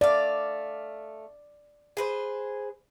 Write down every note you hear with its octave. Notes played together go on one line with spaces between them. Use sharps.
A3 D5 F5
G#4 B4 C5